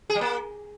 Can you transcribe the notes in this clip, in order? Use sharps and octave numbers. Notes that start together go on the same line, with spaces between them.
G#4
G3
A#3